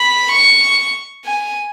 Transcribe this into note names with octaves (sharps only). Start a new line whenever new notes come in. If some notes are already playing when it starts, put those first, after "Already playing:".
Already playing: B5
C#6
G#5